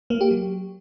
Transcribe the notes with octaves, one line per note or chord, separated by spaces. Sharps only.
A#3
G4
F#3